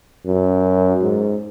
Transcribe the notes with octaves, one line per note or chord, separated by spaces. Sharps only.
F#2
G#2